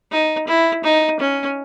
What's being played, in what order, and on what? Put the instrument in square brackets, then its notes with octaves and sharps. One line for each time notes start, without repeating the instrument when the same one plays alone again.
[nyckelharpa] D#4
E4
D#4
C#4